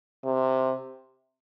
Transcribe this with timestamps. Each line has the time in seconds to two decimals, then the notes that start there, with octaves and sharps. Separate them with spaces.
0.24 C3